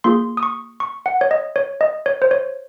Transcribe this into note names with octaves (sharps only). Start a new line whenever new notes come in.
A#3 F4 G#4 C6
D#6
C#6
C#6
F#5
C#5
D#5
C#5
D#5
C#5
C5
C#5